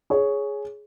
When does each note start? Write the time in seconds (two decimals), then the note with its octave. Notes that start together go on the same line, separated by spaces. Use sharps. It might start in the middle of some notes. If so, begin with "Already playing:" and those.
0.10 G#4 C#5